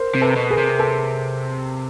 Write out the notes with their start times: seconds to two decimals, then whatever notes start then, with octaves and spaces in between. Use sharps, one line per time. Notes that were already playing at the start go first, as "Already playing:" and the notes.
Already playing: A#4 C5
0.15 C3
0.21 A4 B4
0.36 B2
0.50 G#4 A#4
0.58 C3
0.78 A4 B4